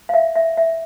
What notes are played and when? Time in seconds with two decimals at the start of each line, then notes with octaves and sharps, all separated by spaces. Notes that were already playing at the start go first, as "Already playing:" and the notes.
0.09 F5
0.14 E5
0.36 E5
0.57 E5